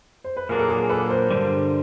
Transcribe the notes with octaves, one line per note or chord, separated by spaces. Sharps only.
C5
B4
A#2 F#3 A#3 D4 G#4 A#4
A4
G#4 A#4
A4 B4
A#4 C5
G2 D3 G3